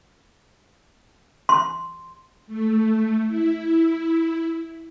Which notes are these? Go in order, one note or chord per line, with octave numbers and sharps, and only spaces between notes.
C6
A3
E4